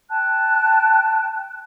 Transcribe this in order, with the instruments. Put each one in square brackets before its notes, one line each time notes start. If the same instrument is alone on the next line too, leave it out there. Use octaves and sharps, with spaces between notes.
[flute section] G5 A5 F#6